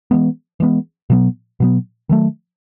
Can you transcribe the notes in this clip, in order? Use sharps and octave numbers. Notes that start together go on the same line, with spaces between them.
E3 G#3 B3
E3 G#3 B3
B2 F#3 B3
B2 F#3 B3
D#3 F#3 A3